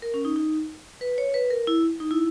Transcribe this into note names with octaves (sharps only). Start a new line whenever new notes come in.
A#4
C#4
D#4
D#4
B4
C#5
B4
A#4
E4
D#4
E4